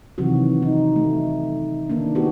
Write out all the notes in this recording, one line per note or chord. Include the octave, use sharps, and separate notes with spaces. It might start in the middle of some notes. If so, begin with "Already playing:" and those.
C3 D#3 E3 F#3 F#4
D#4
A3
D#3 A#3 D4
B3 F#4 G4